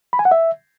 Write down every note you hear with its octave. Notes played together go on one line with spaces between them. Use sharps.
B5
G#5
F#5
E5